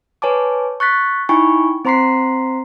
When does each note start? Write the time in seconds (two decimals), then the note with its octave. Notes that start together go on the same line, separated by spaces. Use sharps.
0.22 B4 C#5 G#5 A5 D6
0.80 C#6 F#6 A6 B6
1.29 D#4 E4 G5 G#5 B5 C#6
1.85 C4 C5 A#5 C6 B6 C7